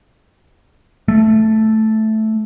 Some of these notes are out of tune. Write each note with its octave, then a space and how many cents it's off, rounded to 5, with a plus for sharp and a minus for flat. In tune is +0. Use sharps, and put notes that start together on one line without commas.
A3 -5